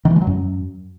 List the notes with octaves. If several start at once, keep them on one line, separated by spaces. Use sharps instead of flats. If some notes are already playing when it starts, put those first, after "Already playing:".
D#3
E3
G#3
F#3
F#2